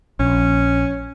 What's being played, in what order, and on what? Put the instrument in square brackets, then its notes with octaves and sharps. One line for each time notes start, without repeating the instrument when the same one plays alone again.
[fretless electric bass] A#1 [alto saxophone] C#4